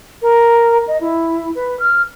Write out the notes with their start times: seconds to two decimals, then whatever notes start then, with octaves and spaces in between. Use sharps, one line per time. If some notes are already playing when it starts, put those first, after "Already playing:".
0.22 A#4
0.87 D#5
1.01 E4
1.55 B4
1.80 F6